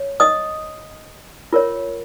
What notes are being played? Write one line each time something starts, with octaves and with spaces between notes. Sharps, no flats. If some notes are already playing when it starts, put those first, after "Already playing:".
Already playing: C#5
D#5 D#6
F4 A#4 C#5